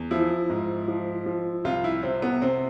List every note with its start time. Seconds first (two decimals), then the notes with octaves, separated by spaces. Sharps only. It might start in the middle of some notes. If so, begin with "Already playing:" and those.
Already playing: E2
0.11 F3 E4
0.50 G#2
0.88 F3
1.26 F3
1.64 C2 F4
1.84 E4
2.03 C3 C4
2.22 B3
2.42 C3 C4